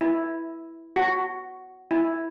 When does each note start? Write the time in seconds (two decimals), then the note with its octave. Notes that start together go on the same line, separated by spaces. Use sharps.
0.01 E4
0.96 F#4
1.91 E4